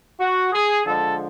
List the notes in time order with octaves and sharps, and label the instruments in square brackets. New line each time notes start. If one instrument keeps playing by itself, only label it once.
[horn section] F#4
G#4
D3 F3 G#3 A4